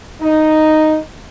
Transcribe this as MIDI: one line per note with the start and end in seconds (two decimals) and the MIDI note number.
0.21 0.96 63